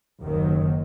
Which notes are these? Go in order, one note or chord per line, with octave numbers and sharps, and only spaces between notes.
F#1 D#2 D#3 F#3